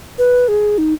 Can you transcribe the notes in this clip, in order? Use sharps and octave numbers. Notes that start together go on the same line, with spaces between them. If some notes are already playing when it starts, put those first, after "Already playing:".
B4
G#4
D#4